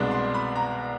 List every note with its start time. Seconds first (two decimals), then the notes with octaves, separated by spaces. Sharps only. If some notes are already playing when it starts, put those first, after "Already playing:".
Already playing: C2 B2 G#3 B3 D4
0.11 C6
0.34 B5
0.56 A#5